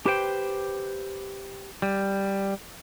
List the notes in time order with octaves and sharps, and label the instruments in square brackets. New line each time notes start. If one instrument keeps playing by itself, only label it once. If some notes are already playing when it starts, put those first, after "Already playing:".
[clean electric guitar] G4 B4 C5 G5
G3